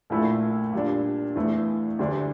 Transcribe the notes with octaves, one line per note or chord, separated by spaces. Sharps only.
A#1 A#2 A3 E4
A#2 G3 D4
E2 E3 A3
D2 D3 G3 D4